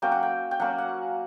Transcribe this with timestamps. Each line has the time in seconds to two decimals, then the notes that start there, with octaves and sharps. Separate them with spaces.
0.02 F#3 A#3 C#4 G5
0.12 F#5
0.23 G5
0.51 G5
0.60 F#3 A#3 C#4 F#5
0.78 F#5